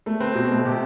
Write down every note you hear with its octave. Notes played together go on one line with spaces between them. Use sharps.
A3 A4
C4 B4
B2
A3
C3 G4